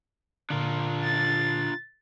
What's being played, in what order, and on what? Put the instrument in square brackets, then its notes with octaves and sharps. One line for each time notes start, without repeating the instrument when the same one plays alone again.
[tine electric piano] A#2 D3 [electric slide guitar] D4 F4 A#4
[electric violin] A6